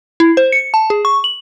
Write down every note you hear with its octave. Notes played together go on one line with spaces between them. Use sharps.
E4
C5
C#7
A5
G#4
C#6
F#7